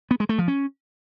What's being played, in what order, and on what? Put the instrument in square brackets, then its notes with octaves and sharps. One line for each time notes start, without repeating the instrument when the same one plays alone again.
[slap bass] B3
G#3
A3
F3
C#4